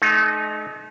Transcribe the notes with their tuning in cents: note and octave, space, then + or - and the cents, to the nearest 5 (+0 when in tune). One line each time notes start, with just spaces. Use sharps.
A3 -45 D#4 -20